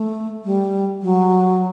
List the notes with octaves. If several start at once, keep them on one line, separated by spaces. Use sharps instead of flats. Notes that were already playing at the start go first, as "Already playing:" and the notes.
Already playing: A3
G3
F#3